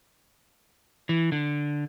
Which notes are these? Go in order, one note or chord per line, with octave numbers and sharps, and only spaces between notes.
E3
D3